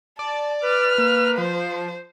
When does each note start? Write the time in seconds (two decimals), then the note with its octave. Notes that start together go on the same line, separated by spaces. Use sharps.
0.19 D5 A5
0.63 B4 F6
0.98 A#3
1.38 F3 C5